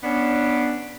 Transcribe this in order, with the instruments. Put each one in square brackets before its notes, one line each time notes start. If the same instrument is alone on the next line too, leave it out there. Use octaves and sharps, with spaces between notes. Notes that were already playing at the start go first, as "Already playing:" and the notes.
[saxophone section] B3 C#4 D4